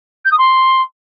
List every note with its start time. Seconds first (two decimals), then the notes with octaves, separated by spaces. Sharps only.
0.25 G6
0.31 D#6
0.38 C6